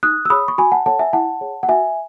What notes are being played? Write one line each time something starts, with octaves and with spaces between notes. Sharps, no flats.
D#4 D#6 F#6
E6
G#4 C#5 B5 D#6
C#6
F#4 G#5 B5
F#5 A5
A4 C#5 F#5 A5
E5 G#5
E4 F#5 A5
G#4 C#5
F#5
F#4 E5 G#5